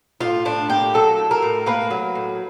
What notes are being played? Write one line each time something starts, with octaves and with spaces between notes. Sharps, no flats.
A2 F4
A2 D4
A#3 G4
F#3 A4
A2
A#4
A2
A#3 B4
F#3
A2